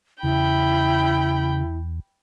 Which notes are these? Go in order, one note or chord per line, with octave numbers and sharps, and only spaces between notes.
E2 C#3 E4 G5 B5